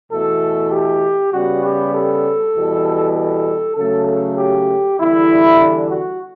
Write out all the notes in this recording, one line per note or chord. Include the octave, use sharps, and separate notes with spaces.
E2 B2 A3 A4
G4
C#3 G3 B3 F#4
G4
A4
E2 B2 G3
A4
C#3 F#3 A3 A4
A4
G4
E2 D3 G3 E4
D4
F#4